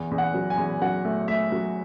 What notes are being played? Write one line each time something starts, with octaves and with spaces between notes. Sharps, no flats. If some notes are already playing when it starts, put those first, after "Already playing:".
Already playing: E2
E2
F#5
F#3
G#5
E2
F#3 F#5
A3
A3 E5
F#3